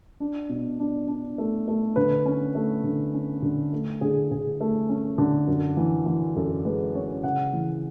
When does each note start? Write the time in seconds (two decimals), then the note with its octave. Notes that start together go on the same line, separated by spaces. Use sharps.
0.20 D4
0.49 B2
0.80 D4
1.08 D4
1.38 A3
1.68 A3
1.96 D3 B4
2.26 C#4
2.55 A3
2.84 D3
3.14 C#4
3.42 D3
3.73 A3
4.01 D3 G#4
4.31 D3 G#4
4.61 A3
4.89 C#4
5.18 D3
5.47 F#2
5.77 E3
6.06 E3
6.36 F#2 A4
6.65 G#3 B4
6.95 C#4 C#5
7.23 C#3 F#5
7.53 E3